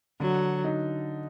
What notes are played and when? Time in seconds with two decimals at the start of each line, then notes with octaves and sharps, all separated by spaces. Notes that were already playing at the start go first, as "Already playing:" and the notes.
0.20 D3 F#3
0.64 D#4